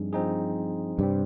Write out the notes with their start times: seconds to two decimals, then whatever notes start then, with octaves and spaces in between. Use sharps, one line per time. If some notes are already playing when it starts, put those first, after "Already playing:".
Already playing: G2 F3 C4 D#4 G#4
0.13 F3 C4 D#4 G#4
0.99 G2 C3 G3 C4